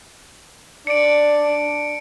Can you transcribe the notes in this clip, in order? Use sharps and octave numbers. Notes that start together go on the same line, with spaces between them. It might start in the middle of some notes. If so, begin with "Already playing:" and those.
D4 D5 C#7 D7